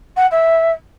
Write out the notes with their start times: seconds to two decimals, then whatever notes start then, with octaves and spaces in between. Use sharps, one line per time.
0.16 F#5
0.31 E5